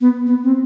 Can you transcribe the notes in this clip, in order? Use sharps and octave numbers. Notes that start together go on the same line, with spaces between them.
B3
B3
C4